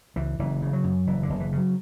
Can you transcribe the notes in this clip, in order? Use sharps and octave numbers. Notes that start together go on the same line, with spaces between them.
C#2 E3
F#1 E3
C#3
F#3
F#2
F#1 E3
D3
F#1
E3
C#3
F#3